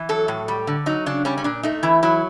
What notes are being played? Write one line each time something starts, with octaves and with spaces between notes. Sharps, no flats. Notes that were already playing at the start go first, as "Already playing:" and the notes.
Already playing: E3
F#3 A4
A2
G3
D3
F#3 D#4
C#3 D4
G3 C#4
C#4
A#2 D4
A3 D#4
E3 E4
F#3 E4